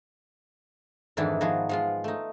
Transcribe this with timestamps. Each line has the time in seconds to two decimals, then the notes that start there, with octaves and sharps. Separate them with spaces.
1.17 F2 G#2 D#3 E3 D4 E4
1.41 D#3 F3 B3 F#4 G#4
1.69 F3 G#3 F4
2.04 A3 D#4